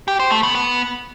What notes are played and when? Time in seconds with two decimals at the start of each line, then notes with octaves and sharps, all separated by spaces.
0.08 G4
0.20 C5
0.31 A3
0.43 B3
0.55 B3